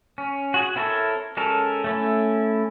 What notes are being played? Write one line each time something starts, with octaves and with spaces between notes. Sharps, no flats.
C#4
F#4 G#4
C4 E4 A4 A#4 C#5
G#3 C#4 A4 A#4
A3 C#4 E4